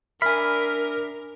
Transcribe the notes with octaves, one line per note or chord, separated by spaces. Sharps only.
D4 A#4 E5 G#5 B5 F6